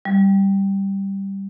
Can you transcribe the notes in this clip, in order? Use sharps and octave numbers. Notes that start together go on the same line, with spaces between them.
G3